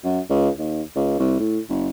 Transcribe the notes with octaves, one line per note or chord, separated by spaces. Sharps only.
F#2
C#2
D#2
C#2
C2
A2
F#1